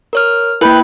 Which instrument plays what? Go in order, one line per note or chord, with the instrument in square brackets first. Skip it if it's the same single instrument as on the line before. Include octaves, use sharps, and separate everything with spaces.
[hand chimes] A#4 C#5 F6
[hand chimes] A#3 E4 [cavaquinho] B4 G5